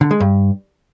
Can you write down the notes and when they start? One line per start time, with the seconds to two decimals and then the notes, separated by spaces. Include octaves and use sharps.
0.01 D3
0.11 G#3
0.20 G2